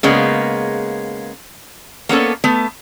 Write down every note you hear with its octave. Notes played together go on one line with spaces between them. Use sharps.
C#3 G#3 A#3 B3
A#3 B3 C#4 A4
A3 B3